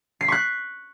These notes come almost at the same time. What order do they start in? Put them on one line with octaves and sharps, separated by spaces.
C7 B6 C#6 F#6